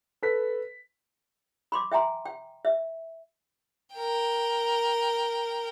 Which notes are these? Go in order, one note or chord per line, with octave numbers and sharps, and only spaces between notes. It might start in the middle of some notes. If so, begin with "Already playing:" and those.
A4 B4 B6
B5 C6 D6
E5 G5 G#5 A#5 C6
G5
E5
A#4 G5